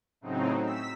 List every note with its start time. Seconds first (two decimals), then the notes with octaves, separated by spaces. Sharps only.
0.21 A2 C#3 F#3 C4 D#4
0.62 E6 B6